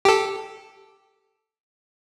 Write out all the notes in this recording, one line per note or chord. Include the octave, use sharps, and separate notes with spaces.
G4 A4